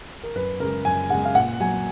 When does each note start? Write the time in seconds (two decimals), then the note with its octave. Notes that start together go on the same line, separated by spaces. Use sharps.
0.23 A#4
0.35 F#2 B4
0.60 C#3 G#3 A#4
0.85 F#2 G#5
1.10 C#3 G#3 F#5
1.25 F5
1.35 A#2 F#5
1.60 F#3 G#5